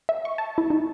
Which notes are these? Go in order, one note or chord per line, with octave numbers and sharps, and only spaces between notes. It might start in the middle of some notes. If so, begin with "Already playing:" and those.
E5
C#6
A5
E4
D#4